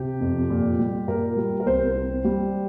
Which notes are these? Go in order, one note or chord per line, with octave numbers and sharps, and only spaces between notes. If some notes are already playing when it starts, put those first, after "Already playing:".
Already playing: C3 G4
F2
A#2
G3
A#2 A#4
G3
A#4
C2 C5
C4
G3